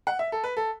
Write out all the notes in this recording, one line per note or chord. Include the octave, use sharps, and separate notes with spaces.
F#5
E5
A4
B4
A4